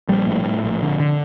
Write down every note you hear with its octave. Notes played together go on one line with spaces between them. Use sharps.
A#1 G3
A2
A2
A#1
D3
D3